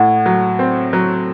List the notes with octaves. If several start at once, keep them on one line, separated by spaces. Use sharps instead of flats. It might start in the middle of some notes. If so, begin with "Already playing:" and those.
Already playing: A2 F#5
F#3
C4
F#3